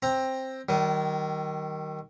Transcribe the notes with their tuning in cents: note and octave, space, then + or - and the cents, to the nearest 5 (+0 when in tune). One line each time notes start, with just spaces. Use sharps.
C4 +10 A#5 +0
D#3 +0 G3 -40